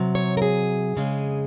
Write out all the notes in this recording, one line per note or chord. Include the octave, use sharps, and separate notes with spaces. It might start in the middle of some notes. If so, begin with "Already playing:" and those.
Already playing: C3 F#3
C#5
A#4
G#4
F2 C#3 G#3